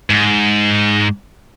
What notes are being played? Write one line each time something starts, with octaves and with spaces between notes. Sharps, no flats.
G#2